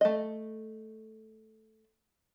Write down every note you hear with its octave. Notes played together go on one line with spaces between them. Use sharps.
A3 D#5